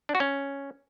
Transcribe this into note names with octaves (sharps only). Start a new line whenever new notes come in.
D4
F#4
C#4